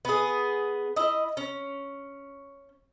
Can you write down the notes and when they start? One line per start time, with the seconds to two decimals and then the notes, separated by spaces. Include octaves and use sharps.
0.05 B3 G#4
0.96 E4 D#5
1.37 C#4